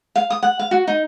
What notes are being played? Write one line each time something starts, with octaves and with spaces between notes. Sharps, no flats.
F5
D#6
F#5
F5
F#4
D#4